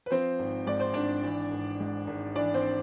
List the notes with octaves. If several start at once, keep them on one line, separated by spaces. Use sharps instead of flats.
B4
F3 C4 C5
G#1
G#2 D5
C5
G#1 D4 D5
E3
G#1
G#2
G#1
E3 D4 D5
C4 C5